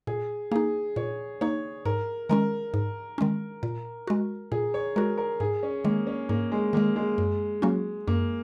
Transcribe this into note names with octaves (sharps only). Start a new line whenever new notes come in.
A#2 G#4
A#3 D#4 G#4
A#2 C#5
A#3 D#4 C#5
G#2 A#4
D#3 G#3 C#4 A#4
G#2
D#3 G#3 C#4
A#2
G#3 F#4
A#2 G#4
C#5
G#3 F#4 A#4
A#4
G#2 G#4
C#4
D#3 G#3 A#3
C#4
G#2 A#3
G#3
D#3 G#3 A#3
G#3
F#2
F#3 A#3 C#4 F#4
F#2 A#3